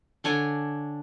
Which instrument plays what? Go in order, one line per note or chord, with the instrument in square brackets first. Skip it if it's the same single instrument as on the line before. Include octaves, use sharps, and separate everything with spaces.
[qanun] D3 D4 C#5 G#5